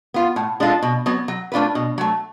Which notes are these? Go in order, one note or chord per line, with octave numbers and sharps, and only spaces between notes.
B3 F4
A2
G#3 D4 F4 A4
B2
F#3 B3
F#3
A3 D4 F4 B4
B2
F#3 A3